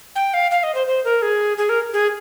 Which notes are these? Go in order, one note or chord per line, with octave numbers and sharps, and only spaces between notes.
G5
F5
F5
D#5
C5
C5
A#4
G#4
G#4
A#4
G#4